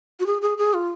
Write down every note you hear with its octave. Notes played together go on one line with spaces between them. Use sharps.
F#4
G#4
G#4
G#4
F4